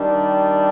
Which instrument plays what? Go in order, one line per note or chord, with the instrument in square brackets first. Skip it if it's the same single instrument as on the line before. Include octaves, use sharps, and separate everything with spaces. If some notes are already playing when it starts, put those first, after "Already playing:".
Already playing: [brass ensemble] D#3 G3 D4